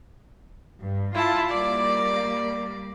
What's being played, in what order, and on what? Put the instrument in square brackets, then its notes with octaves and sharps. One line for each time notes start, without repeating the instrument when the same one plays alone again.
[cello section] G2
[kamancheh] E4 A5 [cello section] F4
[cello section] G3 A#3 [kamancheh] D5